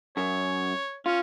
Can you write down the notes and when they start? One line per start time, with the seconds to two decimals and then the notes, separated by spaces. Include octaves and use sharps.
0.17 F#2 C#5
1.06 C#4 F4